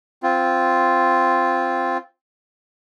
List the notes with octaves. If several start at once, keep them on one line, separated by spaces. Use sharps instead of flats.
C4 F4